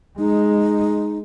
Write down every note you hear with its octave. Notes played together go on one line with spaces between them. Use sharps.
G#3 D#4